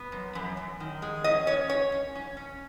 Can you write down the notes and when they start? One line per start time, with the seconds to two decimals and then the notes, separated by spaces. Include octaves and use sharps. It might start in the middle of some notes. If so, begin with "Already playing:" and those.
Already playing: B3
0.12 F#2
0.35 F#2
0.57 F#2
0.80 D#3
1.02 G#3
1.24 C#4 D#5
1.47 C#4 C#5
1.69 C#4 C#5
1.92 C#4
2.15 C#4
2.37 C#4